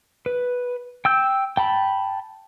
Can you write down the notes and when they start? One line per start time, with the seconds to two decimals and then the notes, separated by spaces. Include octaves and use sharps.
0.26 B4
1.05 G5 E6 G6
1.57 G5 A5 B5